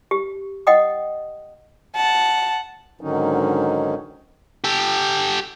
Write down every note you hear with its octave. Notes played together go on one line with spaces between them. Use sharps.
G4
D#5 F#5 G5 D#6
F#5 A5
G#2 D3 D#3 F#3 C#4 D#4
G4 A4